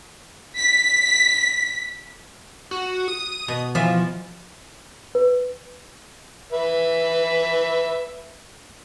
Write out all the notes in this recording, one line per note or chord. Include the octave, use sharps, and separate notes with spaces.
B6
F#4
D#6
B2
E3 F3 F4 E5
B4
B4 E5